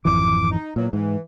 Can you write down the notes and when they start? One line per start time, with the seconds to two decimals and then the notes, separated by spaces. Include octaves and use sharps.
0.05 G#1 F2 E3 D6
0.51 D#4
0.76 E2 A#2 F#3
0.93 G#2 E3